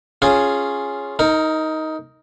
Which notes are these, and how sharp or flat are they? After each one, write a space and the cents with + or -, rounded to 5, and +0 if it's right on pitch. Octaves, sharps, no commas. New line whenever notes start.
C#4 +0 F4 +0 G#4 +0
D#4 +15 A#4 -20